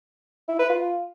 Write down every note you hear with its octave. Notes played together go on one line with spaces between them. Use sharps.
E4
B4
F4